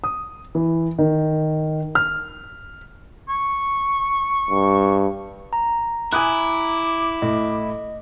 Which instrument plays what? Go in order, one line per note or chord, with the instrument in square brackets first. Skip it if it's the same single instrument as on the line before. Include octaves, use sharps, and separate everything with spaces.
[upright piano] D#6
E3
D#3
F6
[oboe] C#6
[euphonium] G2
[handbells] A#5
[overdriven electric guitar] E4 [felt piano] G#5 D#6 F#6 [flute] D6
[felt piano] A2 [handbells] D#5